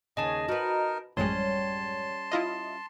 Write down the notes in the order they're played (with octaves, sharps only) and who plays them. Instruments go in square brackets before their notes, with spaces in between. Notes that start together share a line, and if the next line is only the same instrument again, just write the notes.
[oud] D#2 C#3 [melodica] G#4 G#5 [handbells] D#5 A5
[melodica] D#4 A#4 [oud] F#4 B4
[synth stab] A1 F#2 G#3 [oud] G3 C#4 [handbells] C#5 [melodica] A5 C6
[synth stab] E4 F4 D#5